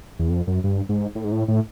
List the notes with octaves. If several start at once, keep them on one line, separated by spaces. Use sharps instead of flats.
E2
F2
F#2
G2
G#2
A2
G#2
A2
A2